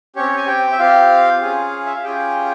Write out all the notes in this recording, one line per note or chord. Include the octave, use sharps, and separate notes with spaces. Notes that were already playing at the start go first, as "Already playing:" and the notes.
C4 C#4 G4 C#5
G#5
G4 G5
E5
C4 F4 G4 F5
C#4 F4 G#4
E5
F5
C#4 F4 G4 G#4 G5